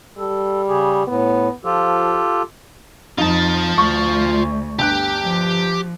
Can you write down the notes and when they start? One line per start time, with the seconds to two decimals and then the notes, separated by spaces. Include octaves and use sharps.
0.18 G3 A4
0.68 C#3 G4 G#4
1.07 A2 B3
1.65 F3 F4 G4 A4
3.18 F2 D#4 F4 A5
3.78 D2 C#6
4.79 G1 D3 G4 F#6
5.24 F3